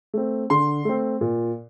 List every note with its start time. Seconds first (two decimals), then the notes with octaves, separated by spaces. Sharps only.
0.14 A3 C4
0.50 D3 C6
0.85 A3 C4
1.21 A#2